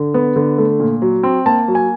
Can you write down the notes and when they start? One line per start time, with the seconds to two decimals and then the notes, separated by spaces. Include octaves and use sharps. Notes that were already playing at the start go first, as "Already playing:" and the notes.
Already playing: D3
0.14 B3
0.36 D3
0.58 A3
0.80 A#2
1.02 F#3
1.23 C4
1.46 A#3 A5
1.68 F#3
1.75 G#5